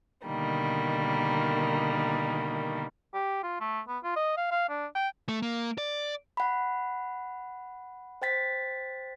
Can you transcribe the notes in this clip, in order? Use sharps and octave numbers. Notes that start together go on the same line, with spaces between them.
B2 D3 D#3 G3 A#3
G4
F4
A3
B3
F4
D#5
F5
F5
D4
G5
A3
A#3
D5
F#5 B5
C5 G5 A6 B6